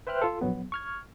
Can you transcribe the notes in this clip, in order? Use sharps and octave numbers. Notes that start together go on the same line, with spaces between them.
B4 C5 E5 G5 F6 F#6
F4 A4
A#1 F#3 B3
C#6 F6 G#6